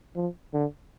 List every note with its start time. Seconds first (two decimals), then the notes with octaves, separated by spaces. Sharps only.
0.16 F3
0.53 D3